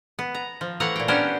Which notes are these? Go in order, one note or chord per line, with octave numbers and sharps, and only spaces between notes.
B3
A#5
F3
E3 A3 F5 F#5 A#5
A#2 G5
B3 C#4 D4 G4 A#4 C5